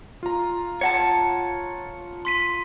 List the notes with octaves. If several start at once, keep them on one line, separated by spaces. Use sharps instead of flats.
F4 A#5
C#5 F#5 A5 C#7
C6 B6 D#7